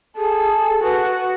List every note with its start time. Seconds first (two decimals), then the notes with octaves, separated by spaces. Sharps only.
0.17 G#4 A4
0.83 F#4 B4